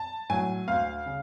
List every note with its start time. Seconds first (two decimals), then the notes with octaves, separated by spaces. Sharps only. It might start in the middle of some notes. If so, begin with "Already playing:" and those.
Already playing: A5
0.30 A2 F#3 G#5
0.68 D2 F5
1.06 C#3